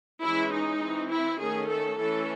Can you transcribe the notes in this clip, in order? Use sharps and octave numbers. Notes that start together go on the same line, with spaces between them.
E3 G#3 C#4 E4
D#4
E3 C4
E4
D#3 A3 C#4 G#4
A4
E3 A3 C#4 A4